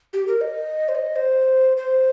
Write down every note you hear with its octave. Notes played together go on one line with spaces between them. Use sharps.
G4
A#4
D#5
C5
D#5
C5
C5